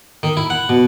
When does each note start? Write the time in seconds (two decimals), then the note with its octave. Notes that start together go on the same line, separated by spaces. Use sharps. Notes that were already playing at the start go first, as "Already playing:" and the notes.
0.23 D#3
0.37 E4
0.50 F#5
0.69 B2